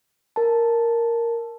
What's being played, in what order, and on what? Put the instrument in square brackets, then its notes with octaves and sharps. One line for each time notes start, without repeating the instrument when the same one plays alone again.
[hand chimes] A#4 A5